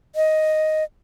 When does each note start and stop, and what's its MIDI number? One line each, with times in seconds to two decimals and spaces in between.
0.16 0.83 75